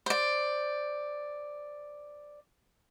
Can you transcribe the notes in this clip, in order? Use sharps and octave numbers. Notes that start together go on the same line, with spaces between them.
C5 D5